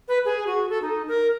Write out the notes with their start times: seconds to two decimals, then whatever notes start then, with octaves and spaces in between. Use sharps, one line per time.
0.08 B4
0.25 G#4
0.47 F#4
0.70 A4
0.82 D#4
1.08 A#4